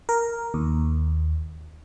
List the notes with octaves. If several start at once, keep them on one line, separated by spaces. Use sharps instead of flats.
A#4
D#2